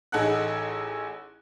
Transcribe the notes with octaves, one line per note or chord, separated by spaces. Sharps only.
A1 D#4 G#4 A4 F#5 F#6